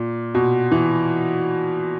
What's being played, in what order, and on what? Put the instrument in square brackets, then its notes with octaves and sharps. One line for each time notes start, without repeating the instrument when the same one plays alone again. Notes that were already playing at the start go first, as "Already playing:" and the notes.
Already playing: [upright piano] A#2
B2
E3